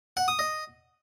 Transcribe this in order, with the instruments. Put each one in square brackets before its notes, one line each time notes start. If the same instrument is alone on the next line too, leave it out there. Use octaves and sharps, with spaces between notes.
[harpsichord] F#5
D#6
D#5